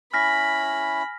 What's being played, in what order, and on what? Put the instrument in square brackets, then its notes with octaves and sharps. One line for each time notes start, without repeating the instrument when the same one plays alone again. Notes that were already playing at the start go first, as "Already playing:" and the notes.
[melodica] C#4 E4 [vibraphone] G#5 [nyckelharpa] B5 [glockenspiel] F6 A#6 B6